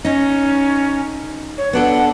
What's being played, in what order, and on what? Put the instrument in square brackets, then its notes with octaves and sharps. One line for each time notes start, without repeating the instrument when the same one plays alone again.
[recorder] C#4 [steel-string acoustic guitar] D#4
[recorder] C#5
[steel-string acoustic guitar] B3 D4 A4 [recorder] F#5